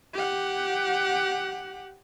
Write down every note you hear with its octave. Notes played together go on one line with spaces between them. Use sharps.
G4 F#5